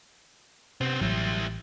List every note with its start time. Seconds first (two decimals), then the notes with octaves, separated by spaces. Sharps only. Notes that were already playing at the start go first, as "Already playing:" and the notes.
0.81 C3 B3 C4
1.02 A1 F#3 G3 E4